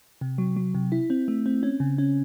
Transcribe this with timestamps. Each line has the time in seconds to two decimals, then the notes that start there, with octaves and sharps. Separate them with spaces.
0.21 C3
0.38 F#3
0.56 F#3
0.74 C3
0.92 E4
1.10 C4
1.28 A3
1.46 C4
1.63 C#4
1.80 C#3
1.98 C#4